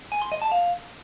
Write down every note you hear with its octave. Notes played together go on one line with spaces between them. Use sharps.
G#5
C6
D#5
A5
F5